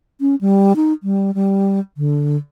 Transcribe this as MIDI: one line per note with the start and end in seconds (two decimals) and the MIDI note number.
0.21 0.35 61
0.41 0.73 55
0.76 0.93 63
1.03 1.31 55
1.35 1.80 55
1.97 2.37 50